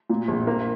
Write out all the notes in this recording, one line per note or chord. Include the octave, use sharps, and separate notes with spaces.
A#2
A#1
A#3